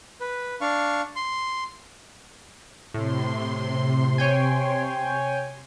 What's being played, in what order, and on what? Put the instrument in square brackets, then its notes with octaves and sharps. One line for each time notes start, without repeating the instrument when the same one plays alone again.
[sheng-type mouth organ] B4
D4 F5 C#6
C6
[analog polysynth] A2 [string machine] C3 C6
[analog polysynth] C#5 G5 G#5